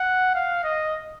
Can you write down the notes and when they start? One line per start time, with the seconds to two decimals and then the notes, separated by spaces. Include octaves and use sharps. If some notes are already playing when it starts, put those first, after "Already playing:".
Already playing: F#5
0.34 F5
0.64 D#5